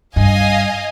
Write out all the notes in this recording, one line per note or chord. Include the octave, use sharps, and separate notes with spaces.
G2 D#5 F5 G#5